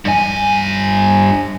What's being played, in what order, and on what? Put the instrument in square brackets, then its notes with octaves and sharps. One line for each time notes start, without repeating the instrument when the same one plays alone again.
[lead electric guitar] G2 G#5